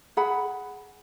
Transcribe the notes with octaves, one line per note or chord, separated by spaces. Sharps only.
G#4 F#5 B5